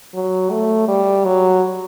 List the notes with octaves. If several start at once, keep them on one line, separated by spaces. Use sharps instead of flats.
F#3
A3
G3
F#3